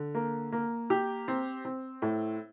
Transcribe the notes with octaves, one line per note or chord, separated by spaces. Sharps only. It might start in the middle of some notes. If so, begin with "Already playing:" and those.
Already playing: D3
A#3
A#3
G4
C4
C4
A2